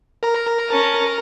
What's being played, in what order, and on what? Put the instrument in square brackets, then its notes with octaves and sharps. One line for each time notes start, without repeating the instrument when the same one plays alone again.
[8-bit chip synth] A#4 A#5
[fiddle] C#4 A5